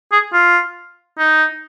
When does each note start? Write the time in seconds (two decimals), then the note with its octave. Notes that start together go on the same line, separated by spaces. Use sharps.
0.12 G#4
0.33 F4
1.19 D#4